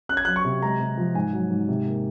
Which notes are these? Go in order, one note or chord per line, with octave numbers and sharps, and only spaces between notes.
C#4 F#6
G#6
F#3 F#6
C#6
C3
G#3 A#5
C3
F3
G#2 G#5
F#3
G#2
C3
A#3